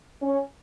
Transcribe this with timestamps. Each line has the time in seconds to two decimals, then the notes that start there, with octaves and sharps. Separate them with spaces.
0.22 C#4